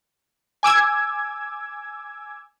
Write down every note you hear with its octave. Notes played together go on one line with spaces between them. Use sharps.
G#5 D6 E6 G#6